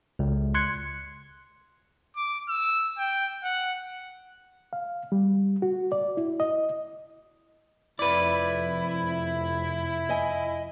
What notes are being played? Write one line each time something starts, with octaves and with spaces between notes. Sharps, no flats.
C#2
C6 F#6 G#6 C#7
D6
E6
G5
F#5
F5
G3
F#4
D5
E4
D#5
F1 F2 E4 B4 D5
D#5 G#5